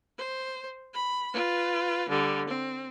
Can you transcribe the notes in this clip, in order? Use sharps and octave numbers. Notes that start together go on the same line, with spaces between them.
C5
B5
F4 B4
D3 G3
C4